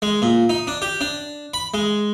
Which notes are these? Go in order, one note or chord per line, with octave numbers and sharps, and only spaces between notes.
G#3
A#2
D#4
D4
G4
D4
B5
G#3